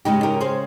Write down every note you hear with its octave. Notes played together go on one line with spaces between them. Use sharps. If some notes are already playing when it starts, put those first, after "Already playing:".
C#3 G#3 C#4 D#4 G4
G4 A#4
G#4 C5